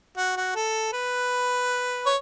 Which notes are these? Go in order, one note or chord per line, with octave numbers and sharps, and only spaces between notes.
F#4
F#4
A4
B4
C#5